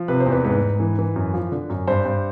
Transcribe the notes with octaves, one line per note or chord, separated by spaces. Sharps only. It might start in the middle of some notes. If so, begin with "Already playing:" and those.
Already playing: F3
C3 B4
C5
E2
B4
G#2 B4
G#2
E3
E3
F#2
F3
D3
F#2
G2 C5
G2